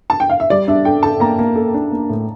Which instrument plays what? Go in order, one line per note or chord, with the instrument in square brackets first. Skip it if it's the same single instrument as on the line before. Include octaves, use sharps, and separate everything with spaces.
[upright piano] A5
G5
F5
E5
[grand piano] G3 [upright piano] D5
[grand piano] D4 [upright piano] E5
[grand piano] A4 [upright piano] G5
[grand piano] A4 [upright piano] A5
[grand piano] A#3 [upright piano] A#5
[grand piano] A#3
A4
D4
A#3
A2